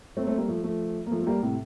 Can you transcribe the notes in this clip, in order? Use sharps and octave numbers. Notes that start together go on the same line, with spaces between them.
A3 C4
A#3
A3 C4
G3 A#3
F3 A3
F3 A3
A#3
F3 A3
A3
G3 A#3
A2 C3